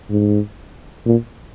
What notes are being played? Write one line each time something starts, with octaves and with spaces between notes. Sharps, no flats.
G#2
A#2